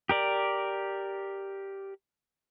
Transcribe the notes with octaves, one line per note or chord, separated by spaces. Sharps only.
G4 A#4 D5